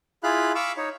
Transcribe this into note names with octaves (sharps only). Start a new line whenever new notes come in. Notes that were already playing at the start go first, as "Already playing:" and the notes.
E4 F4 G#4 F5 B5 F#6
F5 B5 C#6 D6 E6
D#4 C#5